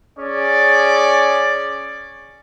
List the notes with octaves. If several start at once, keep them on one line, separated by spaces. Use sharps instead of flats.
C#4 G#4 D5